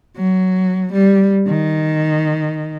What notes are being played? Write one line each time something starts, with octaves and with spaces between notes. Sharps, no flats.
F#3
G3
D#3